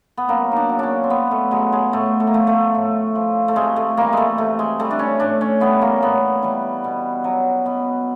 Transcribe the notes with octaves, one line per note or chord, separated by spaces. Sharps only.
B3
F#2 A#3
D4 D#4
C#3 F#3
C#4 D4
C4
F#2 B3
A3
C#3 F#3 G#3
G#3
A2 A3
A3
A#3
F3 A3
A3
A2
F3
A3
C3 G#3
A3
E3 G3 A#3
G#3 A3
C3 A3
G#3
E3 G3 A3
D4
C#4
A2 D4
C#4
E3 G3 B3
A#3
A2 B3
E3 G3
B2
F#3
B2 B3